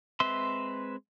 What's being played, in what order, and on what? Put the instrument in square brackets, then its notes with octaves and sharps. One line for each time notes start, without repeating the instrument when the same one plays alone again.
[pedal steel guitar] G#3 C4 B4 E5 C6